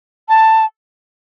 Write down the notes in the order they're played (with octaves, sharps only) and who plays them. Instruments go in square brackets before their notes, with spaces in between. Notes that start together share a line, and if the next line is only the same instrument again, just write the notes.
[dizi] A5